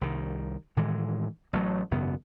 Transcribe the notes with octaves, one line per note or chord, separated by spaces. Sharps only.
C2 D#3
A2 D#3 E3 G#3
A1 F#3 A3
G#1 F#2 C#3 B3